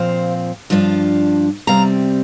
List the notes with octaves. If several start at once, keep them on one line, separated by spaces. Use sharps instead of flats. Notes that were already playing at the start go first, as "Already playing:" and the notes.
Already playing: A#2 F3 C4 C5 F5
G2 F3 D4 F4
C3 G3 C4 F5 A#5